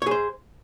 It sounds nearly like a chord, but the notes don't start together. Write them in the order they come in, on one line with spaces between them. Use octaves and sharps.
C#5 G#4 C5